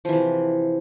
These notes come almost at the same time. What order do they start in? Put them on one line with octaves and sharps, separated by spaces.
F3 E3 C3